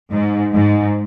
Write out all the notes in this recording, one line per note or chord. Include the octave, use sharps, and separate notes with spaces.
G#2
G#2